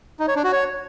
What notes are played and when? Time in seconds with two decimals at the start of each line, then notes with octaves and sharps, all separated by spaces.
0.20 D#4
0.28 C#5
0.36 D4
0.44 F#4
0.52 C#5